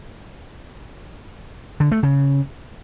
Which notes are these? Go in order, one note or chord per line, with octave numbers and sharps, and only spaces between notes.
D3
A3
C#3